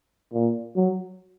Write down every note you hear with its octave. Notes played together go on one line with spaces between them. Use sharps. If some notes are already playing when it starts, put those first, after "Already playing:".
A#2
F#3